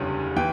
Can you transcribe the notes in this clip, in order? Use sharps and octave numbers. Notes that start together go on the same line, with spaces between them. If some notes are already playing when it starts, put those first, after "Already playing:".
Already playing: F#1 E2 D3 G3 C#4
E3 G5